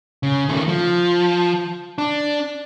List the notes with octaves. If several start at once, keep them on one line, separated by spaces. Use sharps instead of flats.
C#3
D#3 A3
F3
D4